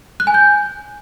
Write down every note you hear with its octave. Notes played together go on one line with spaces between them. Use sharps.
F#6
G#5
G6